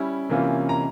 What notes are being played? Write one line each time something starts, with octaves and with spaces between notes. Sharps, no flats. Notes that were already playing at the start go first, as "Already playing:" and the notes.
Already playing: G3 C#4 E4
C3 E3 A#3 C#4 F4
A#5